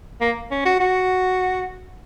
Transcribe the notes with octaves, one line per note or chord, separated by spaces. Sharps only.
A#3
C#4
F#4
F#4